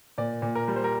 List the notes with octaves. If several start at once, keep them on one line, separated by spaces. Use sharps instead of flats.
A#2 D5
A#2
A#4
G3
C5
A#4